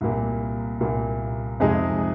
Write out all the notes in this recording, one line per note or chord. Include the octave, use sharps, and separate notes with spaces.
C2 A#2 A#3
C2 A#2 A#3
F2 C3 G#3 D#4 G#4